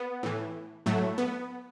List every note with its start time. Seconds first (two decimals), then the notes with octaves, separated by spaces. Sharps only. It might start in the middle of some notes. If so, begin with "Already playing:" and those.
Already playing: B3
0.23 A2 E3
0.86 A2 F#3 A3
1.18 B3